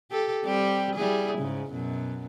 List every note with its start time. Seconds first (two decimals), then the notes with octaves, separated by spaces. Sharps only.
0.11 G4 A4
0.45 G3 C4 G4
0.95 G3 E4 G#4
1.38 G#2 C#3
1.72 F#2 B2